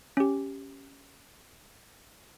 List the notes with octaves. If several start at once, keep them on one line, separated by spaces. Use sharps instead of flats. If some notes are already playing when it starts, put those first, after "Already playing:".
C#4 G4